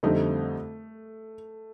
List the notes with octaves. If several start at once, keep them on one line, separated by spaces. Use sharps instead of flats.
F2 D3 G3 A3 C4 D#4